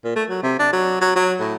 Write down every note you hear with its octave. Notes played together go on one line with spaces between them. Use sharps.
A#2
A3
F#3
C3
D4
F#3
F#3
F#3
A2